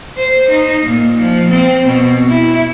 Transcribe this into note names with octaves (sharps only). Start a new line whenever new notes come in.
C5
D#4
A#2
F3
C4
B2
E4